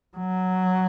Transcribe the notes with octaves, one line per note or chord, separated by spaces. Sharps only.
F#3